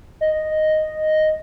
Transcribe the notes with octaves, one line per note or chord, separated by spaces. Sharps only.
D#5